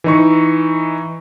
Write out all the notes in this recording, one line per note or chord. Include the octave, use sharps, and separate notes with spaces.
E3 D#4 C#6